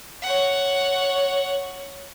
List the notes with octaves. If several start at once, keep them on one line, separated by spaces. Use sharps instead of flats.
C#5 F#5